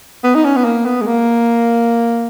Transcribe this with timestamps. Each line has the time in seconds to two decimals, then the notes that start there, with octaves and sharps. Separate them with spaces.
0.24 B3
0.35 D#4
0.45 C#4
0.56 B3
0.65 A#3
0.85 B3
1.01 G#3
1.07 A#3